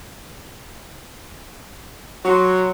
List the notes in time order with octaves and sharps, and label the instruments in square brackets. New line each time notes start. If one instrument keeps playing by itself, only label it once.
[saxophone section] F#3 [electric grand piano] F#4 C6